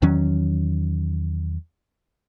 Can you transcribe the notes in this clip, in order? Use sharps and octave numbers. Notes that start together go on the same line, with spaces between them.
E2 D#3 F#3 C#4